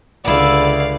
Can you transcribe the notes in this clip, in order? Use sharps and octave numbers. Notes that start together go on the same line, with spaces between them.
C#2 D3 B3 E4 D5 F5